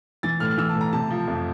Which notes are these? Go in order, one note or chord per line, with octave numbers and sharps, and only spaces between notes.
E3 A6
A2 F6
F6
E3 E6
A5
A2
A#5
C3 A5
F3
F2